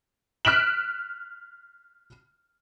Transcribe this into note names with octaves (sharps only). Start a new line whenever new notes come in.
F6 F#6 B6 D7 E7 F#7